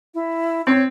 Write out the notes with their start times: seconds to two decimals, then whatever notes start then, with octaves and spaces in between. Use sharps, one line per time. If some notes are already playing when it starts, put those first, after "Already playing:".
0.14 E4
0.67 C4 C#5